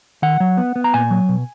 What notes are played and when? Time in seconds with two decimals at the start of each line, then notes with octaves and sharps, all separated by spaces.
0.22 D#3 F#5
0.40 F#3
0.57 B3
0.76 B3
0.84 A#5
0.94 A#2 G#5
1.11 F#3
1.29 B2